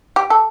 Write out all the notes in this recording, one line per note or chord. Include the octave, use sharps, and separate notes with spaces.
G4
A4